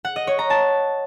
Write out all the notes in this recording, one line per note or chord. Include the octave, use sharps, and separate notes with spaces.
F#5
D#5
C#5
A#5
A5